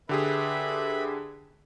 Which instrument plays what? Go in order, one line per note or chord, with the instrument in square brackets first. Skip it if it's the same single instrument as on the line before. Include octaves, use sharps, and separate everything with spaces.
[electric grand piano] D3 G4 G#4 [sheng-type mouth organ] B4 E5 B5